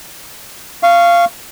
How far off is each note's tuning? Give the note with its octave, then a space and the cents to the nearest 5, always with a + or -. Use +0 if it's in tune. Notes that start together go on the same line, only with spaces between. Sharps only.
F5 -15 C#6 +0